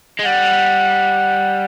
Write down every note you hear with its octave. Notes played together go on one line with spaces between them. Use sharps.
G#3
G3 F#5